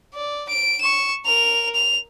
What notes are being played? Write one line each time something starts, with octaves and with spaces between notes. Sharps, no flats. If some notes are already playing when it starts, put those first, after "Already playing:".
D5
D7
C#6 E7
A#4 F7
F7